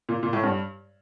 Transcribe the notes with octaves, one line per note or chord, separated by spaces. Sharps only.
A#2
A#2
A2
G2